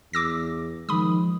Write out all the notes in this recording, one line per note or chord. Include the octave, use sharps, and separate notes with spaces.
E2 D6 E6 A#6
D#3 F3 G#3 B5 D#6